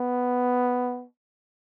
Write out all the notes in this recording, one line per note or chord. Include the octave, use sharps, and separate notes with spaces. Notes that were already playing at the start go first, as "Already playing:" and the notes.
Already playing: B3